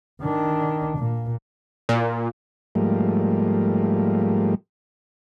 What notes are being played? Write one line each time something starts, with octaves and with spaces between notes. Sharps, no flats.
D#3 D4
A#2
A#2
G#2 F3 G3 A3 A#3